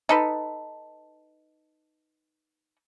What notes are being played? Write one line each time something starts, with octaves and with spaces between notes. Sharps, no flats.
D#4 A4 B4